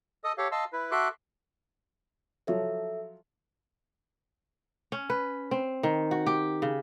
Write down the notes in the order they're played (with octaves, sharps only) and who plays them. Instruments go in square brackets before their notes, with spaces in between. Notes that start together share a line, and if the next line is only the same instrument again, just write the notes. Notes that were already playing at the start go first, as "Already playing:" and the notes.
[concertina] A4 D#5 D#6
G4 A4 C#5 F5
D#5 F5 A5 C6 E6
E4 B4
F#4 A4 E5 C6 D6 F#6
[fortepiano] F3 F#3 C#5 [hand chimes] A4 E5
[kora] C#4
B4
C4
D#3
F#4
G4
C#3